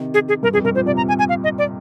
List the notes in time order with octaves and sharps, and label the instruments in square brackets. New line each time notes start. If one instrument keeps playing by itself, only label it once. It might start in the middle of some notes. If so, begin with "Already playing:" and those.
Already playing: [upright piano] C3 D#3
[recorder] G#4
G#4
[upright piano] G2 [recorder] A#4
[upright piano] F2 [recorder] G#4
[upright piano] G2 [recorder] A#4
[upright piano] A#2 [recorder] C5
[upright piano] C3 [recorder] D5
[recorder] A#5
G#5
G#5
F5
D#5
D5